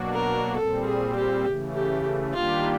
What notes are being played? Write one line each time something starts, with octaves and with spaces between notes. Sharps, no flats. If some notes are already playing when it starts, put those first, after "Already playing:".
Already playing: B2 F#3 A#3 D4 F#4
A#4
A#2 G3 C4 A4
G#4
G4
C#3 E3 A3
G4
D#3 G3 A#3 D4 F4 G4